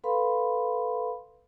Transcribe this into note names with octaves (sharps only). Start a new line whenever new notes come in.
A4 B4 F5 B5 C6